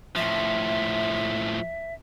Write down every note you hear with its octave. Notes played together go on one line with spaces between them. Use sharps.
A2 F3 E5